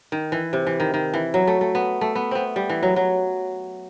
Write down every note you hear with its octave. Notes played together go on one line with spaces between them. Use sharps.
D#3
E3
C3
E3
D#3
D#3
E3
F#3
A3
A3
B3
A3
B3
B3 C4
G3
E3
F#3
F#3